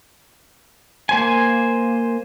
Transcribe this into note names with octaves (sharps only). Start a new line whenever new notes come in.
A#3 C5 G#5